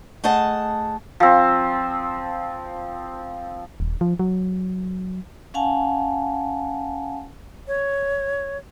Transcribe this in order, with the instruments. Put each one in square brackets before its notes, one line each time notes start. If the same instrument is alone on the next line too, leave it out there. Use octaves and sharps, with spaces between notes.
[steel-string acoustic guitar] A3 G#4 D#5 F#5 A5
[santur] F3 C4
[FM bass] D#1
F3
F#3
[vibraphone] C#4 F5 F#5 G#5 A5
[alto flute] C#5